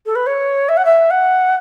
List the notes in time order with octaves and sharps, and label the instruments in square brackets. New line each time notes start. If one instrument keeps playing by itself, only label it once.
[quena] A4
B4
C#5
E5
F#5
E5
F#5